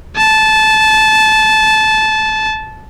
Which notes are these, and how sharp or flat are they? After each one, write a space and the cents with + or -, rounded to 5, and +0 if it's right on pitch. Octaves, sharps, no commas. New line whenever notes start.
A5 -15